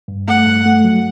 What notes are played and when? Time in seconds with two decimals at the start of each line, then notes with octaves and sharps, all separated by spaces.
0.08 G2
0.28 A3 F#5
0.47 G2
0.66 A3
0.84 F#3